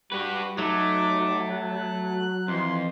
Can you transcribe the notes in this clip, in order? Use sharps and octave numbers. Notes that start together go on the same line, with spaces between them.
G3 F#4 G4 B4
F#3 A3 D#4 D6
F#6
F#4
F2 E3 C6